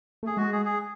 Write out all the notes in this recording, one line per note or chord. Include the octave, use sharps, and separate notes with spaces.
A3
G#4
G#3 F#4
G#4
G#4